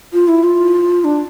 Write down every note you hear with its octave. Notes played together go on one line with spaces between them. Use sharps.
F4
E4
F4
D4